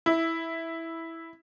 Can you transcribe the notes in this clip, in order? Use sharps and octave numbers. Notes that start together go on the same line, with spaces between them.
E4